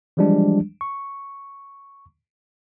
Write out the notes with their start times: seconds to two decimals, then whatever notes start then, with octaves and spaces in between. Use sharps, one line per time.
0.17 E3 F3 G3 G#3 D4
0.81 C#6